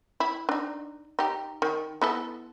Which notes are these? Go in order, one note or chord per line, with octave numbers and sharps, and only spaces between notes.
E4
D4 D#4
D#4 G4
D#3
B3 E4 A4